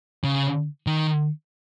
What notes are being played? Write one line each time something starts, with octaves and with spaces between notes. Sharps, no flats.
C#3
D#3